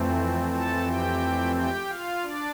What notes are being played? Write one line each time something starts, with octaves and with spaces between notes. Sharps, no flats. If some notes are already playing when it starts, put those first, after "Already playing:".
Already playing: F2 E3 A3 C4
A4 A5
G4 G5
G4 G5
F4 F5
D4 D5